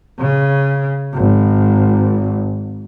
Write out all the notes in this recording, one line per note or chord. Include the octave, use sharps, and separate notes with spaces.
C#3
G#1